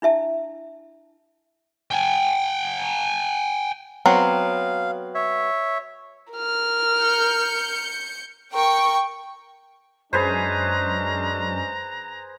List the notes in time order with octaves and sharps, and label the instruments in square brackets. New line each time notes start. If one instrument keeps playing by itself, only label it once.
[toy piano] D4 E4 E5 A5
[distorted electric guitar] G5 G#5
[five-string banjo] F#3 B3 C4 [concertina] F5
[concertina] C#5 E5
[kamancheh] A#4 F6
[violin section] G6 C#7
[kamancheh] A#4 [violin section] G5 C#6
[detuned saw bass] F#2 [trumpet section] G#3 C#4 D4 [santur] G#4 B4 C5 [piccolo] A#5